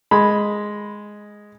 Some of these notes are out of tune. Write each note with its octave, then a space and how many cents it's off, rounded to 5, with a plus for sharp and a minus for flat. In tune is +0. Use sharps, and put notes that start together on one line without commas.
G#3 +0 B5 +0